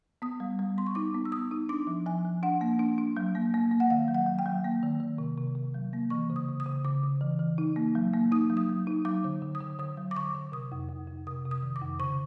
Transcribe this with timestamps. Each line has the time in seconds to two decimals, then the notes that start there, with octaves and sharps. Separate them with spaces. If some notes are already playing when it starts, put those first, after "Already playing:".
0.22 B3 D#6
0.40 G3
0.59 G3
0.78 B3 C6
0.86 C#6
0.95 D#4 D6
1.15 B3
1.25 E6
1.32 B3 D#6
1.51 D#4
1.69 D4 D6
1.87 F3
2.06 F3 G#5
2.25 F3
2.43 D4 F#5
2.61 A#3
2.79 D4
2.98 D4
3.17 F#3
3.35 A#3
3.54 A#3
3.71 A#3
3.80 F#5
3.90 D#3 F5
4.08 F#3
4.14 F#5
4.27 F#3
4.39 G5
4.46 F#3
4.64 A#3
4.83 D#3
5.00 D#3
5.18 C3
5.38 C3
5.55 C3
5.74 F#3
5.93 A#3
6.10 E3 C#6
6.30 C#3
6.36 D#6
6.48 C#3
6.60 D#6
6.66 C#3
6.84 C#3 D6
7.03 C#3
7.21 E3
7.39 E3
7.58 D#4
7.76 A#3
7.95 F#3
8.14 A#3
8.32 D#4 D#6
8.50 F#3
8.57 D#6
8.69 F#3
8.87 D#4
9.05 F#3 D6
9.24 D3
9.42 D3
9.55 D#6
9.60 D3
9.79 D3 D#6
9.97 F#3
10.11 D6
10.17 D3 C#6
10.34 D3
10.52 C3 D#6
10.72 F2
10.89 F2
11.07 F2
11.27 C3 D#6
11.45 C3
11.51 D#6
11.63 D#3
11.76 D6
11.81 F2
11.99 C#3 C#6